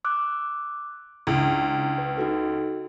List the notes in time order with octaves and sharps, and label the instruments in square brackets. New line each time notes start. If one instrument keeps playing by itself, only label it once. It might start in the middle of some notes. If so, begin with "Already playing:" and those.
[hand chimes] D6 E6 F#6
[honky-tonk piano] C#2 [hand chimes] D4 E4
[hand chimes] B4
D#4 F#4 A4